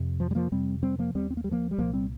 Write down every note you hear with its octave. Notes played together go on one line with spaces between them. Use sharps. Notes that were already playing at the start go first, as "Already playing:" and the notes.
Already playing: F2 C3
F3
G3
F3 A#3
F2 C3 G3 C4
G3 C4
F3 A#3
D#2 G3 C4
C4
A#3
G3
F3 A#3
G3
C2 A#2 F3 A#3
G3 C4